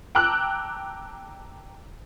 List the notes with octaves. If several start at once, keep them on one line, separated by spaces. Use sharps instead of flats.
G5 A5 A#5 D6 E6 F#6